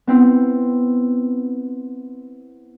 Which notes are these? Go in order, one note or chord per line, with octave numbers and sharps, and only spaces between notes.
B3 C4 E4